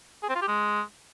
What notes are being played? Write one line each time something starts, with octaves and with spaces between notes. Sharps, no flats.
G#4
C4
F4
G4
G#3